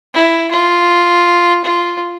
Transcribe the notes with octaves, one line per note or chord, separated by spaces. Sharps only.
E4
F4
F4